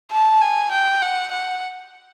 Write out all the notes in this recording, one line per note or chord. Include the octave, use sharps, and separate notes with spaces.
A5
G#5
G5
F#5
F#5